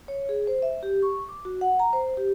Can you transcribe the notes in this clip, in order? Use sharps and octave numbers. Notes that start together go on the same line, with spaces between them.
C#5
G#4
C5
E5
G4
C#6
D6
F#4
F#5
A#5
C5
G4